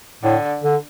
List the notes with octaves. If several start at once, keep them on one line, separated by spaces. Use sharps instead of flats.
A2 D3
D3